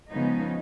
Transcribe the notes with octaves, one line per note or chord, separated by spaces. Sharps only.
C#3 F3 G#3 B3 D#4